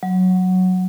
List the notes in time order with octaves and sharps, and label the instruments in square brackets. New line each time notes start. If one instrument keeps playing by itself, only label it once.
[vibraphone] F#3